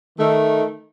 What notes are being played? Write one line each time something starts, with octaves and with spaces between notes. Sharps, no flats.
D#3 A3